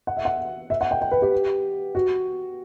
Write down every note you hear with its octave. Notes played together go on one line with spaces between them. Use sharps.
F#5
E5
F#5
E5
F#5
G5
G5
B4
G4
F#4